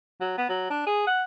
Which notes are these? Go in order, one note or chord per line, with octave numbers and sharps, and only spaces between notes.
F#3
B3
F#3
D4
G#4
F#5